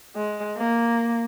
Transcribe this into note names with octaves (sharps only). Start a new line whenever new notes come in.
G#3
A#3